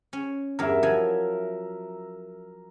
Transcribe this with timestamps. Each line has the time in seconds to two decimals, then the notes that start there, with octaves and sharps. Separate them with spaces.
0.13 C#4
0.59 E2 G2 A#4 E5
0.83 F3 F#3 G#5